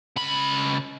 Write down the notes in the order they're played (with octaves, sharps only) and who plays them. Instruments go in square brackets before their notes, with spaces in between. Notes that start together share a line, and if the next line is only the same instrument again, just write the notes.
[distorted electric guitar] C#2 B5